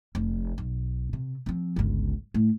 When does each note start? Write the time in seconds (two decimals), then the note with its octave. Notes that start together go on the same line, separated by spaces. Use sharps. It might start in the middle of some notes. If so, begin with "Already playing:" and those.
0.15 F1
0.58 B1
1.13 C3
1.46 F3 C4
1.76 G1 C#2
2.34 A2